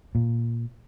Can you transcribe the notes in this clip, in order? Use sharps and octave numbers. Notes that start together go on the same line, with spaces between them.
A#2